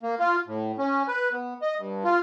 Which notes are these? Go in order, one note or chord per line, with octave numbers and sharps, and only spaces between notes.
A#3
F4
A2
C#4
B4
B3
D#5
G2
F4